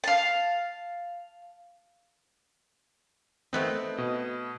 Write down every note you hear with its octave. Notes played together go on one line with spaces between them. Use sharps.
F5 A5
A3 B3 C4 D#4
B2 D#5